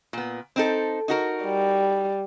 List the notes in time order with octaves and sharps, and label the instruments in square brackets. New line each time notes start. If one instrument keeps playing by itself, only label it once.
[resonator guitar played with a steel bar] A#2 B3
C4 D#4 A4
D#4 F#4 A#4
[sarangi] G3